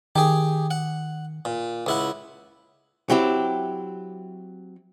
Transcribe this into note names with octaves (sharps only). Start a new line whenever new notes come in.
D#3 G4 G#4
F#5
A#2
C#2 E4 F#5
F#3 C4 E4 G4